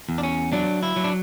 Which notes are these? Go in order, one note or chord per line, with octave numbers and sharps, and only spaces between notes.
E2
D4
C#4
F#3 D4
E4
F#3
D4